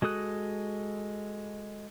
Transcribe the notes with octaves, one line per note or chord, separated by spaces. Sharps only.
G#3 F#4 A4 D#6 F#6